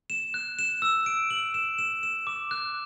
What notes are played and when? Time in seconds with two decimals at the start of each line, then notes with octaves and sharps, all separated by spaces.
0.10 E7
0.34 F#6
0.59 E7
0.82 E6
1.06 D7
1.30 F#7
1.54 E7
1.78 E7
2.03 E7
2.27 D6
2.51 F#6